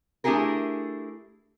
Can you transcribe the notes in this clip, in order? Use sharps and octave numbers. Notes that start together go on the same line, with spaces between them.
A3 D4 E4 G4 G#4 A#4